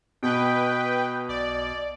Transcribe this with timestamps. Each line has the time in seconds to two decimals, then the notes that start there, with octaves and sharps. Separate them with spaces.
0.23 B2 B4 G5
1.29 B1 D5